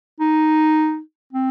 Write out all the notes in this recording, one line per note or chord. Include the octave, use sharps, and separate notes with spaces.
D#4
C4